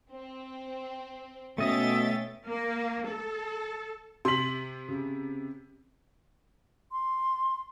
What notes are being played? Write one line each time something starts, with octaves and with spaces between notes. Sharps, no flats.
C4
B2 A3 C#4 D#5 E5 G5 D#6 A6
A#3
A4
C3 C6 B6 F#7
C#3
C6